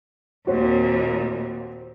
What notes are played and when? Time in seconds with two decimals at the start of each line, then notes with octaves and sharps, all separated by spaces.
0.47 D#2 A#2 C4 F#4